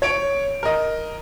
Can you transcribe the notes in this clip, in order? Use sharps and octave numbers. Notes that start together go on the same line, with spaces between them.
C#5 D7
A#4 D#5